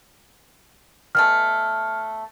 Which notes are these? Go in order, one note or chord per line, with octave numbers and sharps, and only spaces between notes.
B2 E3 A3 F6